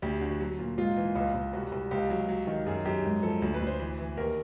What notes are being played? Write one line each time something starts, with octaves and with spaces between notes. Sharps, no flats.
D2 G4
D3 F#4
F#3
A#2
G#2 F4
E3
C#2
C#2
C2 F#4
C2
C#2 G4
F#3
F#3
D#3
F#2 G#4
F#2 G4
G#2
F3 A4
D2
B4
D2
C5
E3 B4
E3
D#2 A#4